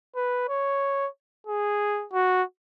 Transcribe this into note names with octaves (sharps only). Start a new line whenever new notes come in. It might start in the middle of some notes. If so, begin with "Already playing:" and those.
B4
C#5
G#4
F#4